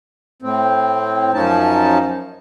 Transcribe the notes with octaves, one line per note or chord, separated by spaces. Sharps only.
A2 C4
F#2 F3 C#4 D#4 A5